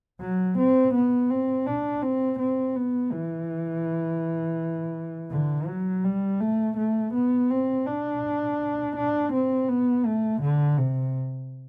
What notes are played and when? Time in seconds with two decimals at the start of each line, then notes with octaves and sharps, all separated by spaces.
0.21 F#3
0.58 C4
0.94 B3
1.30 C4
1.67 D4
2.03 C4
2.39 C4
2.76 B3
3.12 E3
5.31 D3
5.67 F#3
6.04 G3
6.40 A3
6.77 A3
7.13 B3
7.50 C4
7.86 D4
8.96 D4
9.33 C4
9.68 B3
10.05 A3
10.41 D3
10.78 C3